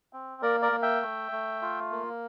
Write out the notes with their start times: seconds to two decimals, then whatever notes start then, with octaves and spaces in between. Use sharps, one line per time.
0.13 C4
0.42 A#3 A#4 D5
0.62 A#4 D5
0.72 A#3
0.82 E5 G5
1.02 A3
1.32 A3
1.62 F4
1.92 A#3